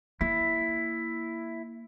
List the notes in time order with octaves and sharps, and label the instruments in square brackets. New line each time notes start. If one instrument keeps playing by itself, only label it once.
[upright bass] A#3 [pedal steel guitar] E4